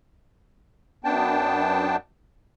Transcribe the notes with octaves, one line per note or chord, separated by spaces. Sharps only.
F#2 B3 D4 G5 A5